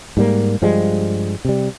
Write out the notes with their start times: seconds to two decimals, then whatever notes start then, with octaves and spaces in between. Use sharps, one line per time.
0.17 G#2 G3 A#3
0.62 G2 F3 G3 G#3
1.45 C3 G3